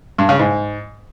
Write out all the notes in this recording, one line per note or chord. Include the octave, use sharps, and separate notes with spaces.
G2
C#3
G#2